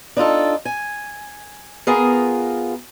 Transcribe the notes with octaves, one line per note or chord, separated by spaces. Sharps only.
D4 D#4 F4 A4
G#5
B3 F4 G#4 A#4